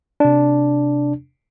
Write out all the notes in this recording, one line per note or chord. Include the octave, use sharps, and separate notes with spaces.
C3 D4